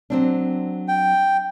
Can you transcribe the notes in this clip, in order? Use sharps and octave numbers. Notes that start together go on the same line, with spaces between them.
F#3 C4 D4
G5